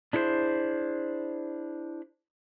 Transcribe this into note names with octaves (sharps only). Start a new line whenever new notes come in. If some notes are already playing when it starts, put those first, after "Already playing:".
D4 E4 G#4 A4 C5